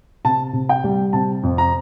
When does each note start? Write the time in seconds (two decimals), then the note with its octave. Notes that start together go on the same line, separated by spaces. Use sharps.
0.25 C3 A5
0.53 C3
0.69 G5
0.84 G3
1.13 C3 A5
1.43 F2
1.58 A#5